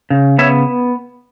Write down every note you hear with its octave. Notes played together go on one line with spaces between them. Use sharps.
C#3
B3 C#5 E5